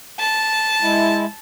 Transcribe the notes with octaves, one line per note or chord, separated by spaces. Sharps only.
A5
G#3 E4